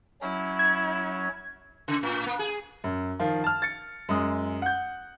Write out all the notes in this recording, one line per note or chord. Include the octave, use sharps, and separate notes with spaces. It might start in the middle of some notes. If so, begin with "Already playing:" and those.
F#3 C#4 E4
G#6
C#3
A2
A#3
G#4
F#2
D#3 F3 F4
A5 F6
A6 C#7
F#2 G#3 D#6
F#5 G6